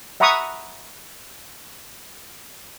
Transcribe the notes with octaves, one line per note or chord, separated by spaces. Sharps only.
E5 F#5 A#5 B5 C#6 D#6